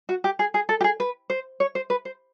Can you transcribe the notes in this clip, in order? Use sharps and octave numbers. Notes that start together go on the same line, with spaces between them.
F#4
G4
G#4
G#4
A4
G4
G#4
B4
C5
C#5
C5
B4
C5